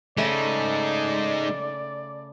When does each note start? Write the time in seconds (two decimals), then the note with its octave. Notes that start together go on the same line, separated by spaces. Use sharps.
0.17 C#3 G#3 A3 D#4 D5